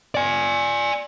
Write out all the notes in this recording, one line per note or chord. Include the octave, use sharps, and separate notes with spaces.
D5 G#5